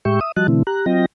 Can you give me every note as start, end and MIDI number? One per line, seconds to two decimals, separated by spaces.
0.05 0.20 45
0.05 0.20 56
0.05 0.20 67
0.05 0.20 76
0.05 0.20 79
0.05 0.20 85
0.21 0.32 76
0.21 0.32 87
0.36 0.47 53
0.36 0.47 55
0.36 0.47 66
0.36 0.47 75
0.36 0.47 81
0.36 0.47 90
0.48 0.63 47
0.48 0.63 50
0.48 0.63 52
0.48 0.63 57
0.48 0.63 60
0.48 0.63 64
0.67 0.86 67
0.67 0.86 82
0.67 0.86 90
0.86 1.06 54
0.86 1.06 60
0.86 1.06 65
0.86 1.06 75
0.86 1.06 79
0.86 1.06 94